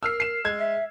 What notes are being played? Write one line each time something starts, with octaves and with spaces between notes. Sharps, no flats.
A#4 E6 F6 C7
C7 E7
G#3 G#6
E5